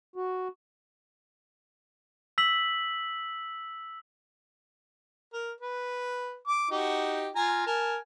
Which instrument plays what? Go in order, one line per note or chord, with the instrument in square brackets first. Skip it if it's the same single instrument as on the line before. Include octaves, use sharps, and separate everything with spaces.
[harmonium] F#4
[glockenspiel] E6 B6 F#7
[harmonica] A#4
B4
D6
D#4 F#4 G4
F4 G#5 A#5
A#4 G#5 A5